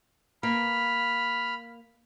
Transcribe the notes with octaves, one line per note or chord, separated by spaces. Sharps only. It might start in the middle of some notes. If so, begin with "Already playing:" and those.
A#3 B5 F6